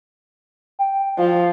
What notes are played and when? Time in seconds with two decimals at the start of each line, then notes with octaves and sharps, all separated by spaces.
0.79 G5
1.18 F3 F5